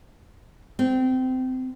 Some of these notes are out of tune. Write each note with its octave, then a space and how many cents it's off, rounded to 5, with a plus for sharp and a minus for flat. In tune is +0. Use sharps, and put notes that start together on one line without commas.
C4 -25